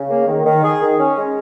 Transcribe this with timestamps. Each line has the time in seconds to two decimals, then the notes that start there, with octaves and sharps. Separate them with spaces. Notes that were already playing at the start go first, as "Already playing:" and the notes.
Already playing: C#3
0.09 A#3
0.27 D#3
0.45 D#3
0.63 G#4
0.80 D#3
0.99 C#4
1.16 G#3